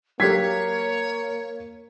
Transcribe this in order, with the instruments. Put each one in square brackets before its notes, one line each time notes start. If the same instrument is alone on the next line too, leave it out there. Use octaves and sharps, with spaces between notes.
[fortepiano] F#3 G4 A#4 [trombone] A#3 [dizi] C#5 [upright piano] G#6 B6 C7